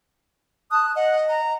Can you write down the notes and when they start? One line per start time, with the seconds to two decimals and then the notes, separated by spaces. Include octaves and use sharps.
0.71 A5 D#6 F#6
0.95 D#5 F#5
1.29 A#5